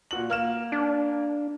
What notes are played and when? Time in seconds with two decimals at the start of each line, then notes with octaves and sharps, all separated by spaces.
0.11 A#2 F#4 F#7
0.30 A#3 F6 E7
0.72 D4